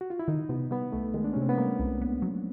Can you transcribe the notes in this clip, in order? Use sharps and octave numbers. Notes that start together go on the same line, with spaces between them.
F#4
F4
E4
D#3 D#4
C3 B3
G3 B3
C2 A3
D#3 G#3
D4
C3 C#4
C4
B3
G3 A#3
C2
B3
F#3